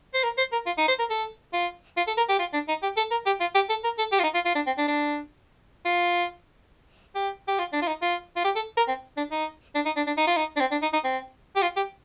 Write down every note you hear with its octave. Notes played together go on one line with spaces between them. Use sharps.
C5
A#4
C5
A#4
F4
D#4
C5
A#4
A4
F4
F4
A4
A#4
G4
F4
D4
D#4
G4
A4
A#4
G4
F4
G4
A4
A#4
A4
G4
F4
D#4
F4
F4
D4
C4
D4
D4
F4
G4
G4
F4
D4
F4
D#4
F4
F4
G4
A4
A#4
C4
D4
D#4
D4
D#4
D4
D4
D#4
F4
D#4
D4
C4
D4
D#4
D#4
C4
G4
F4
G4